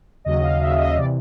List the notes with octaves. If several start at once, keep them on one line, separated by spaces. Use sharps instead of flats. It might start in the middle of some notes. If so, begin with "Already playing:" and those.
D#2 C#3 F#3 D#5
F5
D#2 C#3 F#3 E5
D#5
C3 E3 D5